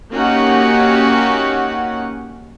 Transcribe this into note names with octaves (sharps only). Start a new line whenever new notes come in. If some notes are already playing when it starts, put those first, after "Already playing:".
A#3 C#4 D#4 F#4 G4 F#5